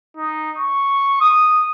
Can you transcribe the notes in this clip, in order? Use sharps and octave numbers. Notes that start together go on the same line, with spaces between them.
D#4
C#6
D#6